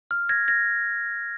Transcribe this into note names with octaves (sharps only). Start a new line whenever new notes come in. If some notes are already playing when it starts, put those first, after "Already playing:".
F6
G#6 A#6
G#6 A#6